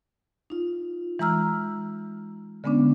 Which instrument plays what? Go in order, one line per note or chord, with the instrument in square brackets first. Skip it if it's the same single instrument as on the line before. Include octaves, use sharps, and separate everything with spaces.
[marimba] D#4 F4
E3 G#3 A#5 E6 F6
D3 G#3 B3 C#4 D4